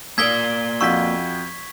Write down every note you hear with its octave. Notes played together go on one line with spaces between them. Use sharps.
A#3 A#4 D5 D#6 E6 G#6 B6 G7
F2 F#4 C#6 E6 B6